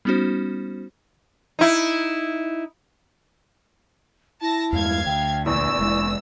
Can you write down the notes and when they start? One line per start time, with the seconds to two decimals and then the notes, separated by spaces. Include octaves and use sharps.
0.05 G3 B3 C#4 D#4 F#4 C5
1.59 D#4 E4
4.42 E4 A5 A#6
4.73 E2 G2 G#3 F5 G#6
5.06 D2 G5
5.46 A#1 E2 E4 C#6 E6
5.79 F1 G#3